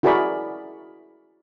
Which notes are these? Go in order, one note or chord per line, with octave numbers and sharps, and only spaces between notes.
E4 F#4 G#4 A#4 D5 B5